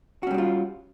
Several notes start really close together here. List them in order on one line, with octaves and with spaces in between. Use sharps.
F#4 C#4 G3 D4 F4